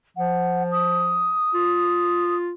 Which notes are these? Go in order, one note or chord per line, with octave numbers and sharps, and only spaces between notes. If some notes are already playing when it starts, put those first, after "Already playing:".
F3 F#5
D#6
F4